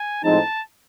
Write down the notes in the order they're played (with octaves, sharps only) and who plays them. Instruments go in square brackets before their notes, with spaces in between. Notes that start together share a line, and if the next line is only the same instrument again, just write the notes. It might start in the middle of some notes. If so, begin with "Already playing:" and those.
Already playing: [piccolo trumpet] G#5
[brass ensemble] A2 F3 G#3 C4 D#4 [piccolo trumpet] A5